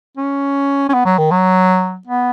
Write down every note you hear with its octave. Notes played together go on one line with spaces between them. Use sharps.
C#4
C#4
B3
F#3
D#3
F#3
B3